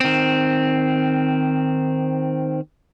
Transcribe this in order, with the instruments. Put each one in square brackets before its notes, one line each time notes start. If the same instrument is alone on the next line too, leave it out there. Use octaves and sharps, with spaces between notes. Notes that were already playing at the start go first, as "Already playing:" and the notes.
[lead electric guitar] D#3 C4